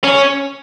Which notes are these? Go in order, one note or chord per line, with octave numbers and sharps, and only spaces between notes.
C#4